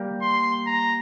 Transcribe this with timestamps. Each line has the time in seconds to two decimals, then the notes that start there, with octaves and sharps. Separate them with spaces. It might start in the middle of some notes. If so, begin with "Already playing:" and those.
Already playing: G3 A#3
0.22 C6
0.67 A#5